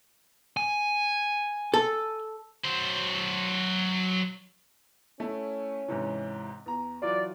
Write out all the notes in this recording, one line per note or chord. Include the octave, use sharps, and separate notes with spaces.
G#5
A4
F#3 C5
A3 C#4 E4
G#2 C3 E3
E2 A#5
E3 F#3 F4 D5